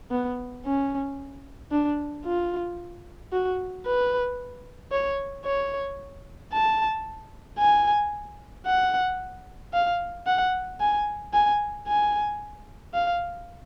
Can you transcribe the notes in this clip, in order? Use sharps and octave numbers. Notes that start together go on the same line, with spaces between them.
B3
C#4
D4
F4
F#4
B4
C#5
C#5
A5
G#5
F#5
F5
F#5
G#5
G#5
G#5
F5